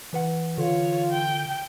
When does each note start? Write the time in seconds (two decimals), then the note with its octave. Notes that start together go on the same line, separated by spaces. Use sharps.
0.13 E3 B4 F#5
0.58 D3 F4 C#5
1.11 G5